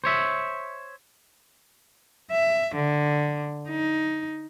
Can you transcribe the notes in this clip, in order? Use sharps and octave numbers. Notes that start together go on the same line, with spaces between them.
C5 C#5 E5
E5
D3
D#4